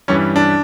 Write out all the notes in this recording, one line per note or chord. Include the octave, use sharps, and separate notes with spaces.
G2 E3 G3 C#4
D4